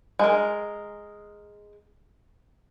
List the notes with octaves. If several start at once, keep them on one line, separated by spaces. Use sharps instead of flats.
G#3 A#4